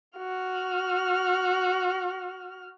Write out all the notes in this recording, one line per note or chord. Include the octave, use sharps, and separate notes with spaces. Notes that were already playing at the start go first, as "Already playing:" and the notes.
F#4 F6